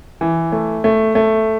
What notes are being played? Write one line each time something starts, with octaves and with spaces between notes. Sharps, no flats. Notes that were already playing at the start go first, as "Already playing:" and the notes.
E3
A3
A3
A3